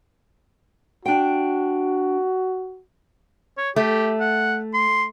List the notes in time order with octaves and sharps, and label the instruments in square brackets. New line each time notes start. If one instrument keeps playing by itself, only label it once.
[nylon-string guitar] D4 G5 [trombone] F#4
[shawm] C#5
[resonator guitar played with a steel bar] A3 [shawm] G4
[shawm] F#5
C6